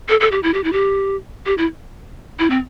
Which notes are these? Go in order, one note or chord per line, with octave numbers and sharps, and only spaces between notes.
A4
A4
G4
E4
G4
E4
G4
G4
E4
E4
C4